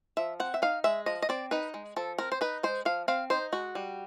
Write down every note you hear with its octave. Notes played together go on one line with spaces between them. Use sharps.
F3 E5
C4 F#5
E5
D#4 F5
G#3 E5
F3 D#5
D#5
C4 D5
D#4 B4
G#3
F3 A4
C4 A#4
C5
D#4 B4
G#3 C5
F3 F5
C4 F5
D#4 C5
G#3 F#4
G3